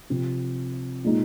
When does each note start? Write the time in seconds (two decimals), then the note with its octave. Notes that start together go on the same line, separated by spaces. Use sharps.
0.10 C3 F3 C4
1.04 A#2 G#3 D#4